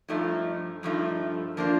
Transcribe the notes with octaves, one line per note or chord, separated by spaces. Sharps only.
G2 F3 A3 D#4
G2 F3 A3 D#4
F3 A#3 D4 F4 C5